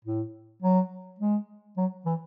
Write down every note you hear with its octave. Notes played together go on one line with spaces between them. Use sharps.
A2
F#3
G#3
F#3
E3